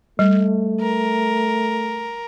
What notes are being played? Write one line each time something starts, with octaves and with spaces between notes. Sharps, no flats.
G3 A3
A#4